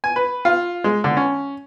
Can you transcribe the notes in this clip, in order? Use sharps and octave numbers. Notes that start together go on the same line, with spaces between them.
G#5
B4
F4
G#3
D3
C#4